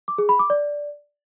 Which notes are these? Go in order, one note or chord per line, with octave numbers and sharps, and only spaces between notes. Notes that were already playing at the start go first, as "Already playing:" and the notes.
D6
G#4
B5
D6
D5